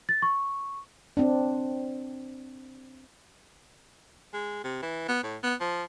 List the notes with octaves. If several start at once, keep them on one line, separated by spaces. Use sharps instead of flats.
A6
C#6
C4 D4
G#3
C3
E3
B3
A2
B3
F3